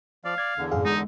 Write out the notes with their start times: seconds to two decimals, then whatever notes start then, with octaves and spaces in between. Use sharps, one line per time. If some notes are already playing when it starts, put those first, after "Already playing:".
0.25 F3 D5 F5
0.38 D5 G#6
0.58 E2 D3
0.72 F#2 A2 G#4 F5
0.85 G#3 D#4